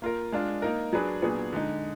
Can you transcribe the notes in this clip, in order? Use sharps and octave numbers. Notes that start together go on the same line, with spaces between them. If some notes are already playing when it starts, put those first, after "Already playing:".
A#3 F4 A#4
G#3 D4 F4
A#3 D#4 A#4
F#3 D4 G#4 B4
A#2 F#3 B3 D4 G#4
D3 G#3 D#4